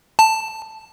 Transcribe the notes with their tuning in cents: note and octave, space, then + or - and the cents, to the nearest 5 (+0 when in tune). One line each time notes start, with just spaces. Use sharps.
A5 +5